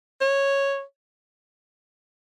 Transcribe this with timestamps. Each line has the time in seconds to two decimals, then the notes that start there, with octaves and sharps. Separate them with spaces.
0.21 C#5